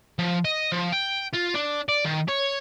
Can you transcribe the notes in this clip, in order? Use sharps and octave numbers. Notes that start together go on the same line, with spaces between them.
F3
D#5
F3
G5
F4
D4
D5
D#3
C#5